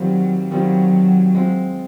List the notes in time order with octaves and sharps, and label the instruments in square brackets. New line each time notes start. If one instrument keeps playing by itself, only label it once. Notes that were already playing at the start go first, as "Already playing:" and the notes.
Already playing: [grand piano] D#3 G3 C4 F4 [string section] F#3
[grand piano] D#3 G3 C4 F4 [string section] F#3
[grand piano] G#3 C4 F4